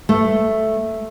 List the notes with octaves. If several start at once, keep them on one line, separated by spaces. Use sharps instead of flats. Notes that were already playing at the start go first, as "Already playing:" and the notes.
A3